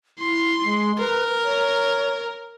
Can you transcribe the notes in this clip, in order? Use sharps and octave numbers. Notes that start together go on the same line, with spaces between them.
E4 C6
G#3
A#4 B4
C#5